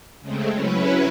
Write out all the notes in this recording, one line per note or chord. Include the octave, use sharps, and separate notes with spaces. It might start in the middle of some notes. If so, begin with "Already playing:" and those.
C#3 G#3 A3 C4
F#3 C#4 E4 B4